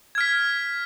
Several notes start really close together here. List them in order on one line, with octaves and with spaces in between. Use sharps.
G#6 F6 B6